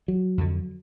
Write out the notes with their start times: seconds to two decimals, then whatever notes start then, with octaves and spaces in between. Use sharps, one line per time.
0.08 F#3
0.38 F2 D3